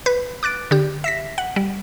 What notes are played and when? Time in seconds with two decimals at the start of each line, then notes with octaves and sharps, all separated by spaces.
0.06 B4
0.43 D6 F#6 A6 D7
0.71 D3 G4
1.04 E5 A#6 B6
1.38 F#5
1.56 G3